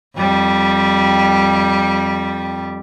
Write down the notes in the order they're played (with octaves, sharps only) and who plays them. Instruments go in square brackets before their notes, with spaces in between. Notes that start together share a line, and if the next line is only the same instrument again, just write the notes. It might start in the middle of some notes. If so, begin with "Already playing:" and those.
[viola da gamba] F2 G3